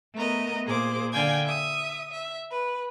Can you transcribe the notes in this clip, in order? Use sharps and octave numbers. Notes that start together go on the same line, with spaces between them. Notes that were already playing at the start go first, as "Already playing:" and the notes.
A3 B3 A#4 D#5
A#2 G#4 C5 D6
D3 D5 F5 G5 G#5 G#6
E5 D#6
E5
B4